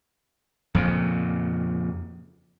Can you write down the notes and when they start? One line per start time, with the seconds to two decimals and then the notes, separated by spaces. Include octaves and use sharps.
0.75 F2 A#2 C#3